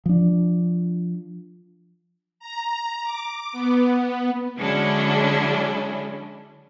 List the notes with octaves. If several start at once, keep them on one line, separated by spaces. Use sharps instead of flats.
F3 D4
A#5
D6
B3
D3 F#3 G#3 C#4 D4 E4